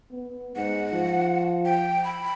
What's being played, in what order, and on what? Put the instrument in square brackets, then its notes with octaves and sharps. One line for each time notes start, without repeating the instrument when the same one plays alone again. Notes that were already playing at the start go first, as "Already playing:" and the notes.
[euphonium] B3
[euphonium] G#2 [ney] F#5
[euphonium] F3
[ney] G5
B5